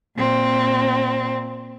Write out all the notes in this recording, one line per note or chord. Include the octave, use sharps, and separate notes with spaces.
A#2 C4